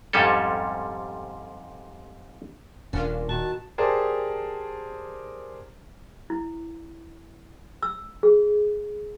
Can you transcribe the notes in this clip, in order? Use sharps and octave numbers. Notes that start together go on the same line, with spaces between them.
F2 G#2 C3 G3 C#4 A4
D#1 C#4 D4 F4 A#4
A#2 D#3 F#4 A5
G4 G#4 A#4 C5 D5 A5
E4
E6
G#4